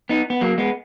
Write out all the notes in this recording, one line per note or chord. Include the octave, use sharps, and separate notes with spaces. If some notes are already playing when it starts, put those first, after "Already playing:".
B3 D#4
B3
F#3 A#3
G#3 B3